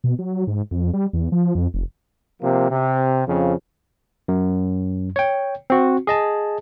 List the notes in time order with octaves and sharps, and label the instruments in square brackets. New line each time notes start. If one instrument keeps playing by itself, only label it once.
[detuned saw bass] B2
F#3
G#2
F2
G3
E2
F3
F2
F1
[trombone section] C3 F3 A#3
C3
F2 C#3 F3
[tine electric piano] F#2
C#5 G5
C4 F#4
G#4 D#5 A5